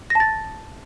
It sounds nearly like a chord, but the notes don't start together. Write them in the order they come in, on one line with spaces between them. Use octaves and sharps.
A#6 A5 A6